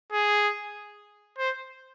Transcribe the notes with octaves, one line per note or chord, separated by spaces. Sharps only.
G#4
C5